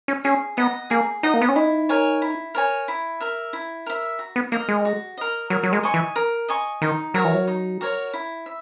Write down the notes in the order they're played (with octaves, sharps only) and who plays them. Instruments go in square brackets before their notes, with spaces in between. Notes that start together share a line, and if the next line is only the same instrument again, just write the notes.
[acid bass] C#4
[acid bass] C#4 [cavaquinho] G#4
[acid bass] B3 [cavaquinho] D#5 F#5 A#5
[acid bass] A#3 [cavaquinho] G#4
[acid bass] D#4 [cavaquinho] D#5 F#5 A#5
[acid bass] A#3
B3
C#4
[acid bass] D#4 [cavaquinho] E4
[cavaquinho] A#4 C#5 G#5
E4
A#4 C#5 G#5
E4
A#4 E5
E4
A#4 E5
F#4
[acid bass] B3
[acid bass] A#3 [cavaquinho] A#4 D#5
[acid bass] G#3
[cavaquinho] F#4
A#4 D#5
[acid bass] F#3 [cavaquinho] A#4
[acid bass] F#3
G#3
[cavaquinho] D#5 G#5 C#6
[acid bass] E3
[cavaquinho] A#4
D#5 G#5 C#6
[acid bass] D#3 [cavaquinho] D#4
[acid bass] F#3 [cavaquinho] F#4 A#4 C#5
[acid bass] E3
F#3
[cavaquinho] D#4
F#4 A#4 C#5
E4
E5